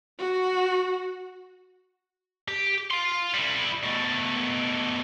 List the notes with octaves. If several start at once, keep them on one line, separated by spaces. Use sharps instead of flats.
F#4
G4
F5 C6
G3 E4
B2 A3